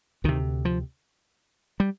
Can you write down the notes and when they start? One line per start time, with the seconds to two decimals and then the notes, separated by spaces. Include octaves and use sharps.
0.24 D2 C3 D#3
0.65 F3
1.80 G3